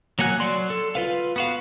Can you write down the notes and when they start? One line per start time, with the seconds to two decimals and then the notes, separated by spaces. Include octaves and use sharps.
0.19 F#3 A#3 F#5 G#5 F#6
0.40 F#3 D5 C6
0.70 A4
0.95 F4 B4 F5
1.36 B3 F#4 F5